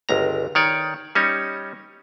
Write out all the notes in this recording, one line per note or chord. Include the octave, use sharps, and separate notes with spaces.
G1 C#2 A#5
D#3 C#5 D5
G3 C#4 D#4 C#5